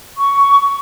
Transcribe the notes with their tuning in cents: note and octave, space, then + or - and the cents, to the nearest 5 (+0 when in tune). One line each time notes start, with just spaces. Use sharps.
C#6 +10